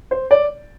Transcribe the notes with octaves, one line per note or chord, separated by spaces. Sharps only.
C5
D5